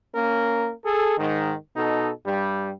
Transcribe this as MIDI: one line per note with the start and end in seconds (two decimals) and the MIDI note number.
0.15 0.71 58
0.15 0.71 61
0.15 0.71 70
0.85 1.14 68
0.85 1.14 69
1.18 1.53 44
1.18 1.53 51
1.76 2.11 47
1.76 2.11 63
1.76 2.11 69
2.26 2.72 43
2.26 2.72 55